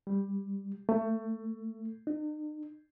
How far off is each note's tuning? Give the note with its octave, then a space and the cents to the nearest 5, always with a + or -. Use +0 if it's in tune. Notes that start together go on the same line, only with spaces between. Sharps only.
G3 +10
A3 +25
D#4 -45